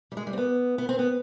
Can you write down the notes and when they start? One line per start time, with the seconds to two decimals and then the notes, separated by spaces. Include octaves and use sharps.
0.12 G3
0.17 G#3
0.27 G3
0.33 C4
0.38 B3
0.78 B3
0.89 C4
0.99 B3